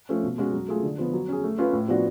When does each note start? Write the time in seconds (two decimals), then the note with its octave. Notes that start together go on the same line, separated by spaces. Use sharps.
0.09 F3 A3 C#4
0.23 B2
0.38 G#3 C#4 F#4
0.53 F#3
0.68 A3 F4 G#4
0.83 D3
0.98 F3 B3
1.13 F#3
1.29 C#4 G#4
1.44 A3
1.58 C#4 F4 B4
1.73 A2
1.88 F3 B3 D4 F#4